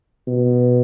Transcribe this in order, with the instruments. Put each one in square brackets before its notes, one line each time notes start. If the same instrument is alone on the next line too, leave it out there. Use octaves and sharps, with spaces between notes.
[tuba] B2